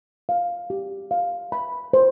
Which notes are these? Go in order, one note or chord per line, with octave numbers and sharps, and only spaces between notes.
F5
G4
F5
B5
C5